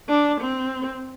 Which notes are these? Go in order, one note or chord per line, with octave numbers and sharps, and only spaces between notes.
D4
C4